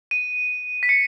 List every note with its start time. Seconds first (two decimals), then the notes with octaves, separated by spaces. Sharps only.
0.11 D#7
0.83 B6
0.89 C#7